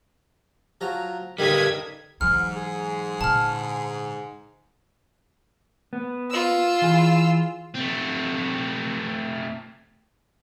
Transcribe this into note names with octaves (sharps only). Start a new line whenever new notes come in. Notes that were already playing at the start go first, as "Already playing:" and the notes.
F3 F#3 A#5
G2 D3 D#3 G3 D#4 D#6 G#6 B6
G#2 E3 F#3 F6
G#4
A#2 D3 A5 F6
B3
F4 E6
E3 G#4
A3 C4